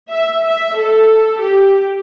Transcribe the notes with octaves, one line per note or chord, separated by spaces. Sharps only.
E5
E5
A4
G4